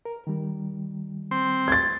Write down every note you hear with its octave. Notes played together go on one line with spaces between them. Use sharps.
A#4
D#3 G3
C4 C6
G#6 A6